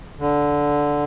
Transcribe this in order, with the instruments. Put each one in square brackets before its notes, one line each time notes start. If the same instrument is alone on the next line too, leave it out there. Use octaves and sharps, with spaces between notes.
[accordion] D3